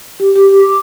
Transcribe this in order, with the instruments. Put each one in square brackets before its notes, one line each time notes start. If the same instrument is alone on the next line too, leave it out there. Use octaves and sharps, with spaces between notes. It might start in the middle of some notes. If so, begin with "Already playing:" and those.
[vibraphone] G4
G4
D6